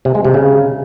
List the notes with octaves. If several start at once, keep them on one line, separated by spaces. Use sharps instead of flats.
C3
G#3
C3
C#3